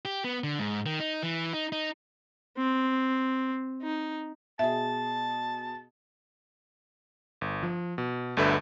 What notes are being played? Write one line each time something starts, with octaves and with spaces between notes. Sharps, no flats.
G4
B3
D3
G#2
D#3
D#4
E3
D#4
D#4
C4
D#4
B2 G#4 E5 A5
G1
F3
B2
G1 D2 D3 B4 E5 G6